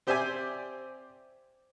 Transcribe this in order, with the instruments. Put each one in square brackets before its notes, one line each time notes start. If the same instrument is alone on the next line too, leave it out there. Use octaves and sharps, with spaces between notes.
[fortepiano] C4 G4 C5 D5 E5 G#5